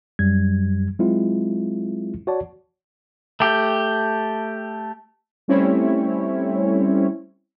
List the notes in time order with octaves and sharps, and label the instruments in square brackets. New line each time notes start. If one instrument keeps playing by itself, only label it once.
[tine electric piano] F#2 F#3 G3 G#6
F#3 G#3 C4 E4 F4
F#4 C#5 D5 A5
[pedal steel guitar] A3 G4
[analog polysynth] G3 A3 C4 C#4 E4 C#5